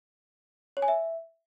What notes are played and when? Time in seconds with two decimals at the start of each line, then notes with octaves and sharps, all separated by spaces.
0.77 C#5
0.82 G#5
0.88 E5